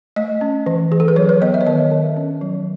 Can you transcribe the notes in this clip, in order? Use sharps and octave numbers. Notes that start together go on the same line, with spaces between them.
A3 D#5
C#4
E3
E3 G#4
A4
B4
F#3 C#5
B4
B3 D#5
E5
C#5
D#3 D#5
D#3
C#4
F#3